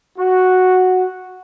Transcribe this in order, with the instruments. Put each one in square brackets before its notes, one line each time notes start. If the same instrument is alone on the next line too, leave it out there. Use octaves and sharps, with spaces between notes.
[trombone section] F#4